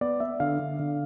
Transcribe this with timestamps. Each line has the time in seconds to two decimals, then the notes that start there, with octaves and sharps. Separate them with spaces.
0.01 B3 D5
0.20 B3 E5
0.40 D3 F5
0.59 D3
0.79 D3